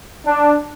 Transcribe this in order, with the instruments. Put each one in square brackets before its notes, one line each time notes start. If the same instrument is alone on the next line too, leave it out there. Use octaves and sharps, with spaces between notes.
[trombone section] D4